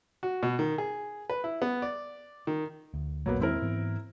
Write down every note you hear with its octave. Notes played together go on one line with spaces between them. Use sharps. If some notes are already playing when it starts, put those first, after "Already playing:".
F#4
B2
D#3
G#4
B4
E4
B3
D5
D#3
D2
D#1 A#1 F#3 A#3 B3
E2 D#3 G#3 C4 E4 A#4
G#2 E3 B3